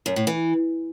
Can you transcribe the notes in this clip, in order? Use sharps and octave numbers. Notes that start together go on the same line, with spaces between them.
F#2
A2
E3